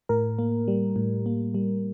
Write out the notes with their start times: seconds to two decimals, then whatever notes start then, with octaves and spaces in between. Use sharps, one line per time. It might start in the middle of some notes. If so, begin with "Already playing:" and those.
0.09 A2 A#4
0.39 A#3
0.68 G3
0.96 A2
1.26 A#3
1.54 G3